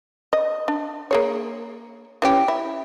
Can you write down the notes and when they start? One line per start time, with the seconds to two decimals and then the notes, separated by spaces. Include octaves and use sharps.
0.33 D#5
0.68 D4
1.11 A#3 G#4 C#5
2.22 E3 C#4 G4
2.48 E4